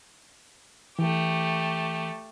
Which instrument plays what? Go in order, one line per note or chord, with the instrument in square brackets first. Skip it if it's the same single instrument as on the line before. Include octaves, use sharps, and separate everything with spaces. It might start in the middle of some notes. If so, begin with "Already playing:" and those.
[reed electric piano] E3 [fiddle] A3 G4